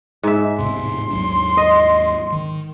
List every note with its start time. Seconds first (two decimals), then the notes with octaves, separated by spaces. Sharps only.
0.23 G#2 E5
0.59 E2 A2 C3 C6
1.11 D#2 F#3 D4
1.57 D#5
2.32 D#3